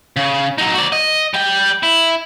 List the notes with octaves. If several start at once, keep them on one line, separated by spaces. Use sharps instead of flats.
C#3
F#3 D#4
F#4 D5
D#5
G3 G5
E4